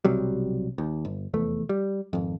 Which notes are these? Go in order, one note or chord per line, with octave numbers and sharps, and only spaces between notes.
B1 C3 F#3 G3
D#2
G1
F1 E2 A3
G3
G#1 F2